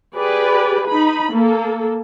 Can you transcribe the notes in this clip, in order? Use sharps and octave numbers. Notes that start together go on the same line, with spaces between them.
G4 G#4 B4 D5
D#4 B5
A#3 A4